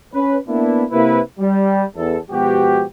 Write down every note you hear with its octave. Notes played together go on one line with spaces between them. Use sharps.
C#4 B4
A#3 B3 D4 E4
C3 A#3 E4 B4
G3
E2 A4
B2 F3 G#3 B3 F#4 G4